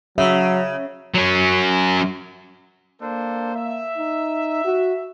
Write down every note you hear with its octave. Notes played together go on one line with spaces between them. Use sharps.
C#3 F#3 E5
F#3 C#4
A#3 D4 A4 C5
E5
D#4
F#4